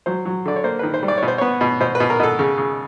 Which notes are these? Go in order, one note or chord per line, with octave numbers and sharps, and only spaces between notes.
F#3 C5
F#3
D3 D5
C#5
A#3 C5
D#3 B4
C5
G3
D5
B2 C#5
C5
B3 C#5
B2
B2 C5
B4
B2
A#4
B2 A4
C#3
C#3